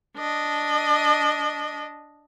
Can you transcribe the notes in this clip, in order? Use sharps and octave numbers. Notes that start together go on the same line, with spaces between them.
D4 D#5